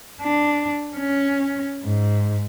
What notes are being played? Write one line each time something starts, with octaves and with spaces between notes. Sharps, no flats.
D4
C#4
G#2